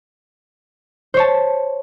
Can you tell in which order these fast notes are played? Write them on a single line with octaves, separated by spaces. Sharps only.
C5 C#5 A5